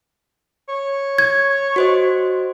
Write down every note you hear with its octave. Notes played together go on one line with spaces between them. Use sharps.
C#5
G#6
F#4 C5 D#5